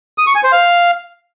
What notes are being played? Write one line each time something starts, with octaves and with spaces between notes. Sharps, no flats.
D#6
C#6
G#5
C5
F5